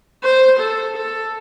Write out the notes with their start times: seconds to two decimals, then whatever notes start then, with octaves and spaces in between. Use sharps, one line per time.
0.24 C5
0.60 A4
0.97 A4